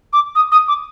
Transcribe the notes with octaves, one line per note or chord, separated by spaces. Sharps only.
D6
D#6
D#6
D6